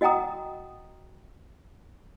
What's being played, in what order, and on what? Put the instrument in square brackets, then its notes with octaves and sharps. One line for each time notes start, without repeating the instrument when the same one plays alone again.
[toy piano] F#4 D#5 F#5 G5 A#5 D#6